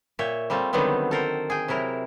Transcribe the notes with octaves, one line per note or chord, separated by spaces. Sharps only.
A#2 C#5 E5 G5
G3 A3 C4 F4
D3 D#3 F#3 G3 B3 C4
A4 A#4 C5
G#4 G5
C3 F#3 E4 A#4